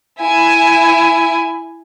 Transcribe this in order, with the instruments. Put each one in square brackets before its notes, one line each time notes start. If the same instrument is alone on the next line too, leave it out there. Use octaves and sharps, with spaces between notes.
[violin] E4 G#5